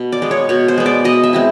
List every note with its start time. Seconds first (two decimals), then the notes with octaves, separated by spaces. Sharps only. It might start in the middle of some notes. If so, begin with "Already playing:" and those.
Already playing: B2
0.12 D5
0.22 G#3 B3
0.31 C#5
0.49 B2 C#5
0.68 C5
0.78 G#3 B3
0.86 D5
1.04 B2 D#5
1.23 E5
1.33 G#3 C4 E4